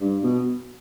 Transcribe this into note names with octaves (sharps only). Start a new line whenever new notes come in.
G2
B2